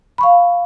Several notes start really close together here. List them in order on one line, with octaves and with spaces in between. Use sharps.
B5 C#6 F5